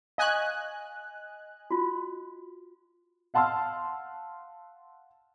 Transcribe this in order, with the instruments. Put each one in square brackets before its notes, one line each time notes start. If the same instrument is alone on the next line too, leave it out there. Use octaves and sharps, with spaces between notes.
[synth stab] D#5 G#5 F#6 [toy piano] F5 C#6
[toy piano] F4 F#4
[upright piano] F5 F#5 A5 C6 E6 F6